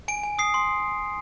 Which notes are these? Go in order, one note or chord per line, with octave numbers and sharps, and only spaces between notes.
G#5 D7
G#5
D#6 C7
C6